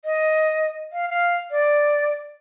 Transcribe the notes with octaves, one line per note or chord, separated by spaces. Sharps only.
D#5
F5
F5
D5